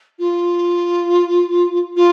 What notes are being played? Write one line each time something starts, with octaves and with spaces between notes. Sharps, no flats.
F4
F4